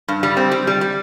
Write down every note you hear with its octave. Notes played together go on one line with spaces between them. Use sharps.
G2
G3
C4
G3
G3
G3